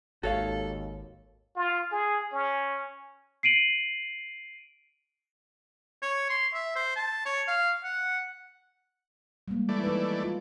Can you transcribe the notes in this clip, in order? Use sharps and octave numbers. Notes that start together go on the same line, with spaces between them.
G#1 D#2 F#4 A4 C#5 F5
F4
G#4
C#4
C7 D7 D#7 F#7
C#5
C6
E5
C5
A5
C#5
F5
F#5
G3 G#3 A#3
E3 A3 D5
D#4 B4
F4